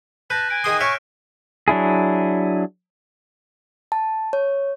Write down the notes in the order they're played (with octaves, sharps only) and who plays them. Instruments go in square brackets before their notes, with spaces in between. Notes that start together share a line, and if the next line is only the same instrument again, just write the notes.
[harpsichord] B4 [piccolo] A5 [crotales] F#6 G6 A#6
[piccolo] G#5 [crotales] D7
[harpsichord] D#3 G#4 C6 [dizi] D#6
[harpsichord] C#5 E5 [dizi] C#6 [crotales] F6 F#6
[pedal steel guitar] F#3 D4 E4 G#4
[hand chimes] A5
C#5